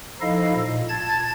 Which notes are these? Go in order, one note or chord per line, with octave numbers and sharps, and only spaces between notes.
F3 D#4 E4 A4 D#5 F5
A#2
A5 G#6 A6